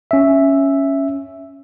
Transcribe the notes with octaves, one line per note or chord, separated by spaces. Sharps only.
C#4 E5